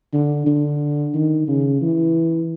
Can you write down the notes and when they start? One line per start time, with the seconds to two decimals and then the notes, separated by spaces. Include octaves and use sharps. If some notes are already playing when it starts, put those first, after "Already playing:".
0.13 D3
0.47 D3
1.14 D#3
1.48 C#3
1.81 E3